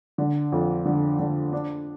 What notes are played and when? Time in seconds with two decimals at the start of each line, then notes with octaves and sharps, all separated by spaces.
0.18 D3
0.52 F2
0.85 D3
1.19 D3
1.53 D4